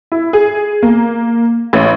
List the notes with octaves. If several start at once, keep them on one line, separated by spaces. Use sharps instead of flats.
E4
G#4
A#3
A1